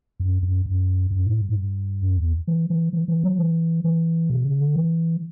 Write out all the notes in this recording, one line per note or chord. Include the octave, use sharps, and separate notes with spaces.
F#2
F#2
F#2
F#2
A2
G2
A2
G2
F#2
E2
E3
E3
E3
E3
F#3
E3
E3
B2
C#3
D3
E3